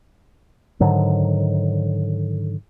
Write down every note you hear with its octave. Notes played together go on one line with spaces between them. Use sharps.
G#2 D3 D#3 F#3